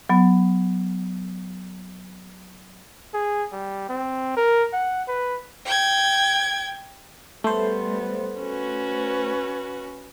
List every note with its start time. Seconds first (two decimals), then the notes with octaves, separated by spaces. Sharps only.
0.09 F#3 B3
3.14 G#4
3.52 G3
3.89 C4
4.36 A#4
4.73 F#5
5.08 B4
5.66 G5 G#6
7.44 G3 A3 B3 C5
8.40 C#4 F#4 B4